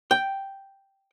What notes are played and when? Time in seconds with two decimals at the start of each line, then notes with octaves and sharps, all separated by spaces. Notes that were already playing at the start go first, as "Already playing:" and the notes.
0.11 G5